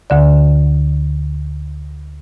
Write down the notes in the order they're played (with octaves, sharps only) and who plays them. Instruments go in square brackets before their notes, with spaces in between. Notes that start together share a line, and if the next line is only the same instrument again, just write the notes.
[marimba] D2 D3 D5